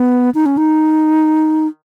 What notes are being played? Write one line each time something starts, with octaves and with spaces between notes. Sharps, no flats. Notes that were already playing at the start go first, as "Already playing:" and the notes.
Already playing: B3
D#4
C#4
D#4